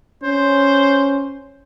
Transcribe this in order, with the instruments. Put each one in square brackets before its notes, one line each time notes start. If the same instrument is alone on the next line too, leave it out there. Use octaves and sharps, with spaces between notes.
[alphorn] C#4 [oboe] C5